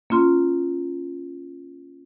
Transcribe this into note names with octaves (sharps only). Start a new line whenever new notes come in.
A#3 C#4 F4 C6